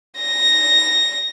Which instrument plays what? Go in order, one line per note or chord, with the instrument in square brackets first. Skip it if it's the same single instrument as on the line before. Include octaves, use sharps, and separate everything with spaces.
[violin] A#6